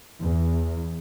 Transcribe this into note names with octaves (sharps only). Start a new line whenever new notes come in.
E2